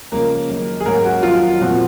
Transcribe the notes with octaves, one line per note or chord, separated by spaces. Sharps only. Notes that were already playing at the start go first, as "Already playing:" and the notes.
C#3 F3 G#3 A#3 C#4 A#4
F#2 D#3 A#3
G#4
G#2 F#3 A#3 C#4 A#4
F#4
F2 D#3 F#3 F4
A#2 F3 C4 F#4